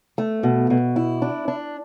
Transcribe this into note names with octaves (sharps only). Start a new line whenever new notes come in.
A3
B2
B2
E4
D4
D4